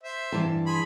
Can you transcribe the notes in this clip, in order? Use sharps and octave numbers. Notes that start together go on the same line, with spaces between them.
C5 E5
G2 E3 A5
G#4 B5 C6